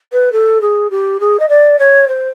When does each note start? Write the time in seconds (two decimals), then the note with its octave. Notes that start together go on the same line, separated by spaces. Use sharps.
0.12 B4
0.32 A4
0.61 G#4
0.90 G4
1.20 G#4
1.39 D#5
1.49 D5
1.79 C#5
2.08 C5